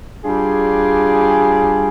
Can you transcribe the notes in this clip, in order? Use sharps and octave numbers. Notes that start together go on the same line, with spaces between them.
G3 D4 F4 G#4